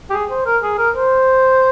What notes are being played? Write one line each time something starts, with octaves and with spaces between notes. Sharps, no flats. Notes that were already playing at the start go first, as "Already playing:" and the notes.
G4
G#4
C5
A#4
G#4
A#4
C5